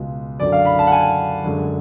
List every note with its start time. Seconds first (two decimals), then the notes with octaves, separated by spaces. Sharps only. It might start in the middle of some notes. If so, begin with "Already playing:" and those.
Already playing: C#2 B2 G#3
0.40 F#2 D3 F#3 D5
0.52 F5
0.65 B5
0.79 A5
0.87 F#5
0.92 G#5
1.43 F#2 D3 G#3